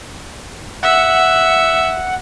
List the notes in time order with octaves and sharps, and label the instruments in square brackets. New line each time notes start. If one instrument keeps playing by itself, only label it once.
[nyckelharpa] E5 [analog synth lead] F#5